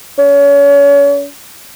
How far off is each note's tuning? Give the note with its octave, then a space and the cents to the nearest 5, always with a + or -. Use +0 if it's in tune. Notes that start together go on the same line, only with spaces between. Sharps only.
C#4 +35